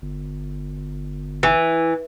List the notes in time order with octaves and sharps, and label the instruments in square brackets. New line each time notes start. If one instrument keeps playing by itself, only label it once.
[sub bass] G1
[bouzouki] E3